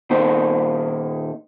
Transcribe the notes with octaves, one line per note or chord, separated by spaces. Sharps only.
A#2 D#3 A#3 D#4 C5